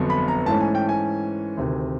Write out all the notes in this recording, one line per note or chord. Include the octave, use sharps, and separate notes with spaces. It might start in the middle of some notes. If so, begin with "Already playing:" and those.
Already playing: G1 F2 D3 F#3 B3
B5
A#5
G#2 E3 A3 C#4 A5
G#5
G5
G#5
D2 C3 D#3